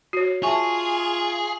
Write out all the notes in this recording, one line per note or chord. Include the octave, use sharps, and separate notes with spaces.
F#4 C#5 C7
F4 G#4 E5 G#5 A5 C#6